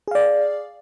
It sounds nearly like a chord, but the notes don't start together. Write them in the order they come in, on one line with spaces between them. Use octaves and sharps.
G#4 F5 D5